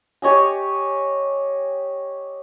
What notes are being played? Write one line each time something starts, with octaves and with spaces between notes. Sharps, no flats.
G4 C#5 D#5 G#5